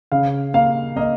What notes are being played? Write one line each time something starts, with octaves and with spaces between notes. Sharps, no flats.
C#3 F5
A#3 F5
A#3 D#5